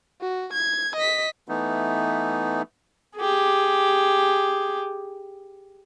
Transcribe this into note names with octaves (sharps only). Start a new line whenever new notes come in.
F#4
G#6
D#5 B6
E3 A3 B3 D#4
G4 G#4